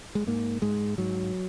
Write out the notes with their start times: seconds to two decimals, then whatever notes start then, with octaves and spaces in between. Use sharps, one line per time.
0.15 G#3
0.27 G#2 A#3
0.62 G#2 G#3
0.98 G#2 F#3